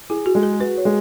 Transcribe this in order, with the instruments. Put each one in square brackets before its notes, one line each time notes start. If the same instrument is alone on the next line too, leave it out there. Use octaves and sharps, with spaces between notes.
[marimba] E4 [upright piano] G#4
[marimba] F#4
[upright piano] G#3
[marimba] G#4
G#4
[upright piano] F#4 [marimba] B4
[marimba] C#5
[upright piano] G#3